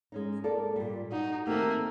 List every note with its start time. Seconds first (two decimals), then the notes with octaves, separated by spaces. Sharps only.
0.12 G#3 C#4 D#4
0.44 A#3 A4 D5
0.76 A#2 G3
1.12 D#4 F#4
1.47 D#3 A3 A#3 C4 G4